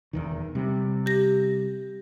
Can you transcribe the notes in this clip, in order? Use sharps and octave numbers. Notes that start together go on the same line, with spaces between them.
E1 E2 D#3
C3 G3
G4 A#6